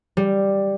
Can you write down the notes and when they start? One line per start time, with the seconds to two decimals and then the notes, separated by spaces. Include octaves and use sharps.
0.17 G3